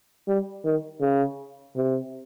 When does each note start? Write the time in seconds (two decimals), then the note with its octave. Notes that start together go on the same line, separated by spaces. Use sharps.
0.28 G3
0.65 D#3
1.01 C#3
1.76 C3